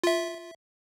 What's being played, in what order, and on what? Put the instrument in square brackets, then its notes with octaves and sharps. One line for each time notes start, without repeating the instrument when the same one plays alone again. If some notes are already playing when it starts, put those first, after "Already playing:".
[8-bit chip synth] F4 E5